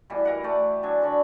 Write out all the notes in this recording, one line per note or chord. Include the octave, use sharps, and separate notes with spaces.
B2 E3 G3
E4 A#4 F#5
A3 D5 G5
F#3 D4 G#5 A5
D3 F#3 B5